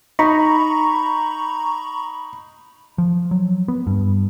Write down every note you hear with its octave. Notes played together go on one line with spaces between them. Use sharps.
D#4 A#5 B5 C#6
F3
F#3
B3
G2